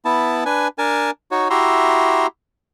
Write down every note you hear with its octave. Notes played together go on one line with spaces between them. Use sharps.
B3 E4 A5
D4 B4 G#5
D4 A#4 G#5 A5
D#4 F#4 C#5
E4 F#4 G4 E5 A#5 C6